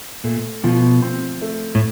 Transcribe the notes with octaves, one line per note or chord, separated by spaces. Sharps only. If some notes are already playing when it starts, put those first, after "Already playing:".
A#2 A3
B2 F3
C4
A3
A2